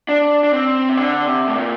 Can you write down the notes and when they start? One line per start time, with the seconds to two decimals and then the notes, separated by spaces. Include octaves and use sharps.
0.09 D4
0.44 D4
0.53 C4
0.89 C3
0.97 D3
1.27 C3
1.47 A2
1.57 A#2